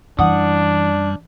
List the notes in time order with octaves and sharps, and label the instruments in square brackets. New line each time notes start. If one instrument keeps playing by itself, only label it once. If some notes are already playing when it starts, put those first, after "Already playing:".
[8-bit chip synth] F#2 G3 [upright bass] E3 [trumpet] D4 [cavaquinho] F#5 D#6